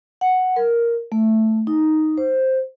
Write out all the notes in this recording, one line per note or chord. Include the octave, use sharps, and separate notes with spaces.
F#5
A#4
A3
D#4
C5